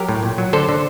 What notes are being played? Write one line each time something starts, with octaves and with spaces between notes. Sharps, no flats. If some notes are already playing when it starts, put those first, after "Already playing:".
Already playing: F#3 G4 A#4
A2
A#2
F#3
D3 A4 C5
D3